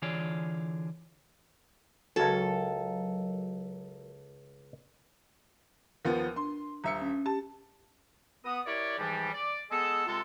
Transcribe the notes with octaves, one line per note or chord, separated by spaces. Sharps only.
D3 E3 F4 G#4 C#5 D5
C#2 F#3 A4 A#4 C#5
D#2 F3 B3 A#4
D4 C6
D#1 E5 A#5 C#7
C#4
G4 A5
B3 D#6
E4 G4 A#4 C#5 D5
G#2 E3 F3 G3
D5
G#3 B3 G#4 A4
C3 G#3 F4 A4